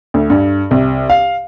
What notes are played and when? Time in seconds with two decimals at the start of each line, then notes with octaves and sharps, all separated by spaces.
0.14 D2
0.30 G2
0.71 C2
1.10 F5